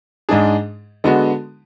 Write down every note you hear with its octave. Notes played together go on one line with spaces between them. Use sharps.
G#2 G#3 D4 G#4
D3 G#3 B3 F#4